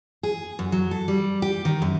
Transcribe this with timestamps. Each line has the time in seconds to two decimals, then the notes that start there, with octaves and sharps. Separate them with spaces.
0.23 G#4
0.59 F#2
0.72 F#3
0.91 A4
1.08 G3
1.42 G4
1.65 D#3
1.82 F#2